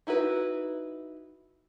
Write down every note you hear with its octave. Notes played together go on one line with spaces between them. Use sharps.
D#4 E4 F#4 B4